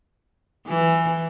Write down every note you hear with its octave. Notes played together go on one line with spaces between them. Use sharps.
E3